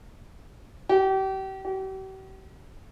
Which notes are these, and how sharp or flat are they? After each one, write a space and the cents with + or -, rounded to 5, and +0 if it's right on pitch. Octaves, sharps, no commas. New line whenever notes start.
G4 -35
G4 -45